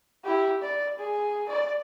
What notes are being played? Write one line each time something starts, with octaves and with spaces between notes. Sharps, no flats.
E4 G4
D5
G#4
D5